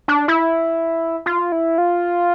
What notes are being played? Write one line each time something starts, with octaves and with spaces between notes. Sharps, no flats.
D4
E4
F4
E4
F4